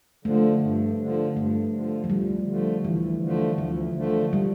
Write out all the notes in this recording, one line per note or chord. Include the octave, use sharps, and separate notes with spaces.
D3 F3 A3
G2
D3
F3
G2 A3
D3 F3
F3
D2 G3
D3 F3 A3
D2 E3
D3 F3 A3
D2 F3
D3 F3 A3
G3